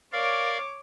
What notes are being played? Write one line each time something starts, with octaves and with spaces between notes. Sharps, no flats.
A#4 C#5 D5 F5 D6